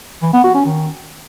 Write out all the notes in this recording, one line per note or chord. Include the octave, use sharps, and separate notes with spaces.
E3
B3
F#4
C#4
D#3